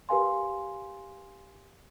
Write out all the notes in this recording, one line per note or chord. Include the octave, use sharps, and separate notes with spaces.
G4 A#4 B4 F5 G#5 C6